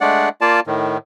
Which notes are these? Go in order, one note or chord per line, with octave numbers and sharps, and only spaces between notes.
G#3 A3 D4 D5 F#5
A#3 F4 D5 A5
A2 D#3